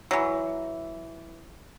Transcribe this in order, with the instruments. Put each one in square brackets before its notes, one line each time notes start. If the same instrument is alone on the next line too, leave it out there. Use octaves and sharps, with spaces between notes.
[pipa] E3 F#3